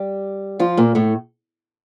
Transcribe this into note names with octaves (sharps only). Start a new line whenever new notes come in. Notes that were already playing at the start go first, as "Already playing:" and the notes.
Already playing: G3 G4
F3 F4
A#2 A#3
A2 A3